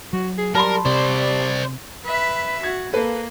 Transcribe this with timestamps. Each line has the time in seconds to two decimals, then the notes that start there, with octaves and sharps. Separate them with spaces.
0.13 F#3 F#4
0.38 G#4
0.55 G3 A#4 A5 B5 C6
0.85 C3 G3 C5 D5
2.05 B4 E5
2.63 F#4 G#6
2.93 A#3 A4 B4